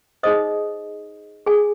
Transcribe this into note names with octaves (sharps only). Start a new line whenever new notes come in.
D#4 G#4 C5 D#5 D#6
G#4 G#5